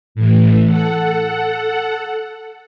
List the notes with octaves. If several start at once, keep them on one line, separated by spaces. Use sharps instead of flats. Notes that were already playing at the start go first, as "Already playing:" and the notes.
A2 E3
A4 F#5